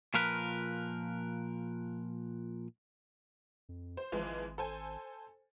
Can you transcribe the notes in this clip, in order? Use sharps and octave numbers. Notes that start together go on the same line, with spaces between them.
A#2 F3 A#4 B4
F2
C5
G#1 E3 F3 G#3
A4 C5 G#5